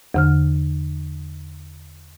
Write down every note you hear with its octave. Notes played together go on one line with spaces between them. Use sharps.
E2 D3 F6